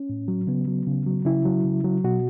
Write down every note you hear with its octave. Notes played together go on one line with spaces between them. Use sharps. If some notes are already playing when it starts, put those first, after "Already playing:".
Already playing: C#4
A2
F#3
C#3 B3
F#3
C#3
F#3
C#3 E4
F#3
C#3
F#3
B2 F#4